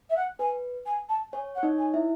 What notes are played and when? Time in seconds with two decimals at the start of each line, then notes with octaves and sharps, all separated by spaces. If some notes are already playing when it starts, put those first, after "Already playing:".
0.10 E5
0.16 F#5
0.39 B4 G#5
0.86 G#5
1.09 A5
1.33 C#5 G#5
1.55 C#5 F#5
1.63 D#4 D#5
1.78 G#5
1.94 E4 E5